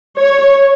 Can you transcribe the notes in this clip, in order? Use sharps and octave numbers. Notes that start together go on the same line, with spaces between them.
C#5